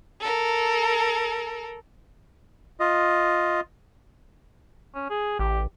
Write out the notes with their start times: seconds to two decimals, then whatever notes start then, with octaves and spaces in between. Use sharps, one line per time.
0.20 A4 A#4
2.80 F4 D#5
4.95 C#4
5.10 G#4
5.39 A1 G4